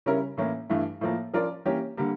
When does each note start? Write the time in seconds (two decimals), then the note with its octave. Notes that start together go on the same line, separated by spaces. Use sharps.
0.06 C#3 G3 C#4 E4 A#4
0.37 A2 E3 A#3 C#4
0.69 G2 E3 A3 E4
1.01 A2 F3 A#3
1.34 F3 C#4 F4 A#4 D5
1.65 E3 A#3 C#4 G4
1.97 D3 G3 A#3